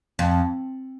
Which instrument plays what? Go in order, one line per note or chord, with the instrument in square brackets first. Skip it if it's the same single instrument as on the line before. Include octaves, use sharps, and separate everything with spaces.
[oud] F2